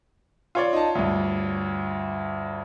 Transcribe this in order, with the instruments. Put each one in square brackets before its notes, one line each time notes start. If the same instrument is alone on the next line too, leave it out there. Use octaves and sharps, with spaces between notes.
[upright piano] F4 C#5 D5
[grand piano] D#4 A5
D2 G2